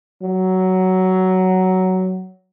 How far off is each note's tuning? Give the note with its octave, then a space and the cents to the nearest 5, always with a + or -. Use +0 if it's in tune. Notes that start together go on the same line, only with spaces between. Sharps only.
F#3 +10